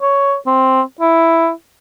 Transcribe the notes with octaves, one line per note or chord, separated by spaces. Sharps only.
C#5
C4
E4